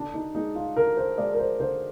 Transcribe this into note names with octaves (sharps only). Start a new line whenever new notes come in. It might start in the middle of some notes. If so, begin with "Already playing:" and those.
Already playing: D3 D4
D#4
G#3 D#4
F4
D3 A#4
C5
G#3 D5
A#4
C5
D3 C5